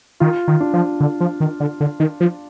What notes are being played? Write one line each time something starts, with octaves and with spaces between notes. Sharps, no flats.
D#3 F4
D#3
D4
F3
D3
F3
D#3
D3
D3
D#3
F3